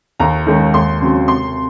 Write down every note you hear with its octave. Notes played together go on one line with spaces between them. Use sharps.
D#2 A#5
D#3 G#3 C#4
D#2 C6
C#3 F#3 C4
C3 C6